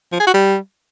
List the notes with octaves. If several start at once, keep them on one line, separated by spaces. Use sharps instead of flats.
F3
G#4
F#4
G3